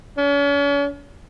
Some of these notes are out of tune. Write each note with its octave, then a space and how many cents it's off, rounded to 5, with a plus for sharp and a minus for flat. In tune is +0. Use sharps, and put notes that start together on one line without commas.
C#4 +40